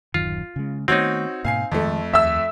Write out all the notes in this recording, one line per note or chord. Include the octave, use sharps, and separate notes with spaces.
D1 F#2 D#3 F4
C#3 G#3
D#3 A3 B3 C4 D#4 F#4 C#5
G#2 B2 A#3 F5 G#5 C7
F2 D#3 F3 G#3 A3
D#2 E5 E6